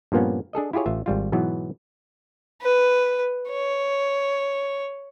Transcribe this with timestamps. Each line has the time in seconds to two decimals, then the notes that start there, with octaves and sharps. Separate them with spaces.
0.12 G2 A#2 F3 A#3 B3 C#4
0.53 D4 G#4 A4 D#5
0.73 E4 F4 G4 G#4 C#5
0.86 A1 F4 E5
1.06 G#1 G3 F4
1.32 G#2 B2 E3 F#3 B3
2.62 B4
3.51 C#5